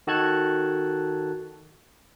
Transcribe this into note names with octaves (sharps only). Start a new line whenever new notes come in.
D#3 F#4 A4 A5 F#6 G#6